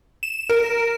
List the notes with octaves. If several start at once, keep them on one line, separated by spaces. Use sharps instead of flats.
E7
A#4